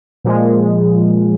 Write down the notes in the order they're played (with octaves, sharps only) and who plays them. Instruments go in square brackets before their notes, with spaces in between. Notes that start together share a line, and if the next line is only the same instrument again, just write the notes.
[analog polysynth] A#2 F3 G#3